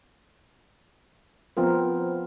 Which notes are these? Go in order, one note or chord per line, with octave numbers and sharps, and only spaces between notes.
F3 B3 C4 F4 A#4